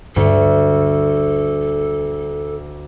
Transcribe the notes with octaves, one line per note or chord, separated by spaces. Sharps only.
D2 G2 G#3 A4